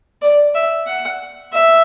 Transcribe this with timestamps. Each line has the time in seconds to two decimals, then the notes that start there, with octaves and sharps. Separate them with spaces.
0.22 D5
0.55 E5
0.87 F#5
1.53 E5